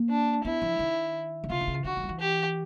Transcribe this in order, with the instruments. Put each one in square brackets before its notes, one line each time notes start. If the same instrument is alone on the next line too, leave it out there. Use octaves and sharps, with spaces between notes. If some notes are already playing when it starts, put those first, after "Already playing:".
Already playing: [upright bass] A#3
[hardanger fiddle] D4
[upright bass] B3 [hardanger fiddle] E4
[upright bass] F3
D#3
D3
[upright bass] C#3 [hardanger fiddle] F4
[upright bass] D3
C#3
[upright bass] D3 [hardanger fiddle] F#4
[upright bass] E3
F3
E3
[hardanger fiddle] G4